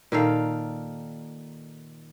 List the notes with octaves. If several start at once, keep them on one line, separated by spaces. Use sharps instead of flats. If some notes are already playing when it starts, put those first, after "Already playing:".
A#2 D#3 A4 F5